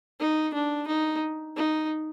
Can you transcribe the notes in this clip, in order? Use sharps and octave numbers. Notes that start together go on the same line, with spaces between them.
D#4
D4
D#4
D#4